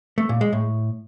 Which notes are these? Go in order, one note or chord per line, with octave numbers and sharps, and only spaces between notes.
A3
A#2
G#3
A2